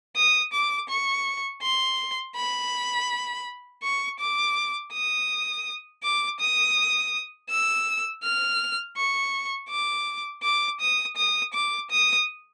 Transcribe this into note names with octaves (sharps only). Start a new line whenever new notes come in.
D#6
D6
C#6
C6
B5
C#6
D6
D#6
D6
D#6
E6
F6
C#6
D6
D6
D#6
D#6
D6
D#6